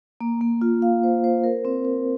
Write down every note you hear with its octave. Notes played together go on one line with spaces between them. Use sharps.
A#3
A#3
F4
F5
C5
C5
A#4
C4
A#4